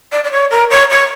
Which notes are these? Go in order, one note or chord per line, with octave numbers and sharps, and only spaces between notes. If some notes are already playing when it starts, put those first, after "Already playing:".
D5
D5
C#5
A#4
C#5
C#5